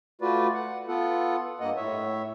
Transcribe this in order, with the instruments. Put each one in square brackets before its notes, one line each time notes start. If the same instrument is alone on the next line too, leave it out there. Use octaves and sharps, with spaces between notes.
[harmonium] A3 F4 F#4 B4 D5
F#5
B3 F4 A4 F#5
G2 A#3 D#5 F#5
A2 C#5 E5